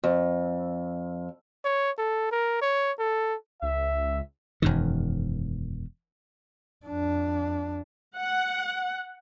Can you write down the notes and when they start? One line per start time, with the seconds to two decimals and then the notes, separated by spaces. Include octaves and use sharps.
0.04 F2
1.65 C#5
1.98 A4
2.32 A#4
2.62 C#5
2.99 A4
3.62 C#2 E5
4.62 E1 F#2 D#3
6.86 F2 D4
8.15 F#5